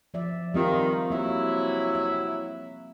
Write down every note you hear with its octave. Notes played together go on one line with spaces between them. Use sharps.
F3 D5 E5
D#3 G3 C4 F4
C3 F#3 A#3 E4 E5
E5